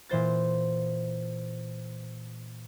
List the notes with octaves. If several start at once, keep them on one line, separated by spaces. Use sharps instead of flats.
A#2 E3 C5 A6